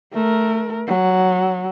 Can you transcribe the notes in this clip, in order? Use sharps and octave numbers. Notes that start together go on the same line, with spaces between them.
A3 A#4
F#3